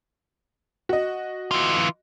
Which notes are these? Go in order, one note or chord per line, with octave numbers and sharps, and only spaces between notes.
F#4 D#5
E3 F4